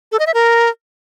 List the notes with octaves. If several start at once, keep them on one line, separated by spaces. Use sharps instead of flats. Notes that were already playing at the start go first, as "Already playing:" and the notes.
A4
D#5
E5
A#4